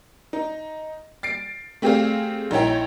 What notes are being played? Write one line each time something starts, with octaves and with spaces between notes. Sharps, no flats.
D#4
A6 C7 D7
A3 C4 G4 G#4 D5 F5
A#1 D#4 E4 C#5 G5